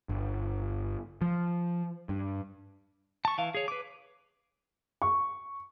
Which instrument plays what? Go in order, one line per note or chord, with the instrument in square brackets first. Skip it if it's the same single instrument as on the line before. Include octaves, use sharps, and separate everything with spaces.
[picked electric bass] G1
F3
G2
[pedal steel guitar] A5 C#6
E3 F5
G#4 C#5
B4 D6
[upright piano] C#6